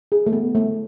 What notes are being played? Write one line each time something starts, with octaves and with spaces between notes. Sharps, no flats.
G#4
A3
B3
A3